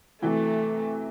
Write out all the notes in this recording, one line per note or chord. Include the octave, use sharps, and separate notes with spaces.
C3 E3 F#3 A3